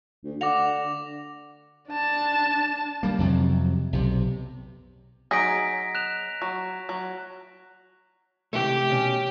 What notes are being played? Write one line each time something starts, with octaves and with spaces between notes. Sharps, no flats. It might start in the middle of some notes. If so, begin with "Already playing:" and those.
D2
D3 F#5 D6 A#6 F7
D4 A5
G3 A#3
F2 C3 F#3
B1 C3
F#3 D#4 G#4 A#6 B6 D7
F#6 E7 F7
F#3
F#3
C3 E3 A3 G4
B2 C#4